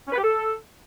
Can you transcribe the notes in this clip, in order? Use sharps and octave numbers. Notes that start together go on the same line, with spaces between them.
C#4
B4
G4
A4